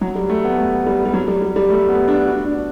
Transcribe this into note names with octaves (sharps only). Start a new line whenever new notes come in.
F#3
G3
A3
B3
A3
G3
G3
F#3
G3
G3
G3
A3
A3
B3
D4
F#4
D4